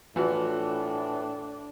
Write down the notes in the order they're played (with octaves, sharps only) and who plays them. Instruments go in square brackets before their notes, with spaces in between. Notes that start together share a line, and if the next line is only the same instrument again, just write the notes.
[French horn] A2 [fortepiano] E3 F3 F#4 [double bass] D4